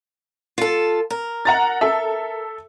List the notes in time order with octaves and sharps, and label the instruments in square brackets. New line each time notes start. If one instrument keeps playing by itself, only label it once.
[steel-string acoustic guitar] F4 A4
A#4
[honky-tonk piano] F#5 A#5 A6
A4 E5